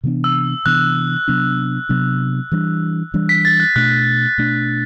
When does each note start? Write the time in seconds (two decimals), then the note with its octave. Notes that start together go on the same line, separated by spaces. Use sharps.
0.04 C3 E3 B3 D4
0.24 E6
0.66 C3 E3 B3 D4 F#6
1.28 C3 F#3 B3 D4
1.89 C3 F#3 B3 D4
2.52 E3 G3 D4
3.14 E3 G3 D4
3.29 B6
3.45 A6
3.60 F#6
3.76 B2 A3 D4 F#6
4.38 B2 A3 D4